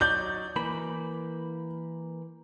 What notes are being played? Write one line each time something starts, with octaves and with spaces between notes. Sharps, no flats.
F#3 D#4 D5 G6
E3 A#3 B5